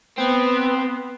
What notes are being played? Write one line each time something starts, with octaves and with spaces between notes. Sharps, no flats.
B3 C4